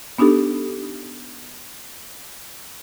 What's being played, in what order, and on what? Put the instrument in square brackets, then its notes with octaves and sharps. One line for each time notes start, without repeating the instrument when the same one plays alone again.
[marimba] B3 D4 D#4 G4 A4